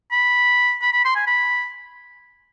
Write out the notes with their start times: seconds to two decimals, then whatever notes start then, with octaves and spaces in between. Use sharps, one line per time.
0.12 B5
0.82 B5
0.93 B5
1.05 C6
1.16 G#5
1.27 B5